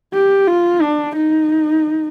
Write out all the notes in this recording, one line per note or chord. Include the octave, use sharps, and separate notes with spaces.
G4
F4
D4
D#4